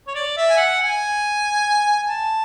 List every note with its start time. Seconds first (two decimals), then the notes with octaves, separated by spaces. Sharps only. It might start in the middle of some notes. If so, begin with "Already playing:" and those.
0.07 C#5
0.15 D5
0.37 E5
0.50 G#5
0.57 F#5
0.80 G#5
2.07 A5